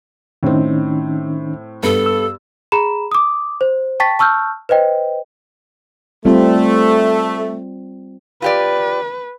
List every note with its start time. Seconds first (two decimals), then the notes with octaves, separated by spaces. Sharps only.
0.43 A2 D#3 C4 C#4 D#4
1.83 G2 B3 A4
2.06 E6
2.72 G#4 A#5 B5 E7
3.12 D6 D#6
3.61 C5
4.00 G5 A5 C#6 A6 B6
4.19 A5 C#6 E6 F6 G6
4.69 B4 C5 D#5 G5
6.25 G3 A3 C4 F4
8.42 F4 G4 B4 D5